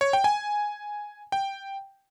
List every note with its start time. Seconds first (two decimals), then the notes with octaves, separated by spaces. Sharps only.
0.01 C#5
0.13 G5
0.24 G#5
1.32 G5